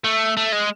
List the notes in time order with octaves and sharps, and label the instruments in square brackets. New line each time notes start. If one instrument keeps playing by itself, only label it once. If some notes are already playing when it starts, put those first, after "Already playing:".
[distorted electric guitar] A3
A3
G#3